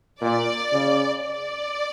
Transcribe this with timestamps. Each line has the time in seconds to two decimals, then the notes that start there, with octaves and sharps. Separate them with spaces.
0.21 A#2 D5
0.72 C#3
1.22 D5